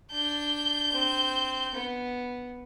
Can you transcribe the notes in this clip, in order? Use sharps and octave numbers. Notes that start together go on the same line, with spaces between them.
D4 G6
C4
B3